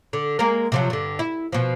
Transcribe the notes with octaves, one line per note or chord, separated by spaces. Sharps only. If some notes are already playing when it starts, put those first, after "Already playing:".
D3
G#3 A#3 A#4
C3 F3 F#3
G2 D3
E4
B2 F3